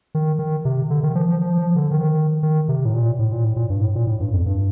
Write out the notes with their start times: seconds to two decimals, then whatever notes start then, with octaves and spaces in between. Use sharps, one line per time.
0.15 D#3
0.39 D#3
0.65 C3
0.90 D3
1.03 D#3
1.15 F3
1.28 F3
1.41 F3
1.58 F3
1.75 D3
1.91 D#3
2.43 D#3
2.68 C3
2.85 A2
2.94 A#2
3.19 A2
3.32 A#2
3.44 A2
3.56 A#2
3.70 G2
3.81 A2
3.95 A#2
4.07 A2
4.20 G2
4.33 F2
4.46 G2